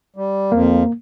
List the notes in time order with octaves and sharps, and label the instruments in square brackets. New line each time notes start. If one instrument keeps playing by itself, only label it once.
[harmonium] G3
[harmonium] F2 [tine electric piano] A#3